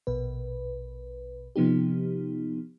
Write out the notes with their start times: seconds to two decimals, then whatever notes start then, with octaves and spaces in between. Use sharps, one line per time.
0.07 A#1 B2 B4
1.56 C3 F3 B3 D#4 G4